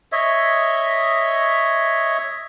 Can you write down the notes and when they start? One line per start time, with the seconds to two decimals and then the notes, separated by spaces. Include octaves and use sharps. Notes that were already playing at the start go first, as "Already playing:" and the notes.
0.12 C#5 D#5 E5